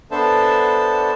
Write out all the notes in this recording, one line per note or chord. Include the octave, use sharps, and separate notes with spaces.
B3 D4 A4 C5 E5 A5